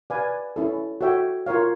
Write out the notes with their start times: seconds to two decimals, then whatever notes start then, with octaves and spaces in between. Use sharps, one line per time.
0.10 B4 D5 F5 G#5
0.56 C#4 E4 A4
1.01 F#4 A4 C#5 E5 G5
1.46 F4 A#4 C#5 F5